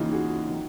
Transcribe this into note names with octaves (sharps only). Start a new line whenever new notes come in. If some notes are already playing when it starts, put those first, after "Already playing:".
Already playing: D#2 C#3 E3 D#4 F4
F#4 G#4
D#3 F#3